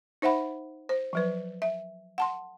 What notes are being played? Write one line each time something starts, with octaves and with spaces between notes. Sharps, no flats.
D#4 C5 E5 F#5 B5
C5
F3 F#3 B4
E5
F#5 A5 C6